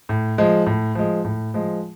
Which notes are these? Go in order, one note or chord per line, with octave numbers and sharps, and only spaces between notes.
A2
F3 G#3
A2
F3 G#3
A2
F3 G#3